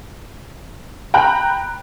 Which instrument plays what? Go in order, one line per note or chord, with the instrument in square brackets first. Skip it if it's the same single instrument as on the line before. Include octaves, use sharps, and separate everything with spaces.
[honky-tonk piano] G5 A#5 B5 F#6